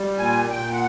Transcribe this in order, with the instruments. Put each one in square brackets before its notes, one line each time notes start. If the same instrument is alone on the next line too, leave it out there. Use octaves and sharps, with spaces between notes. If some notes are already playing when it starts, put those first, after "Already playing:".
Already playing: [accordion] G3
A#2 G#5
A#2 G5
F#5